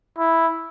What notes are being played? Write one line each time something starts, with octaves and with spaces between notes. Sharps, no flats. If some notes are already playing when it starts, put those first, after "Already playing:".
E4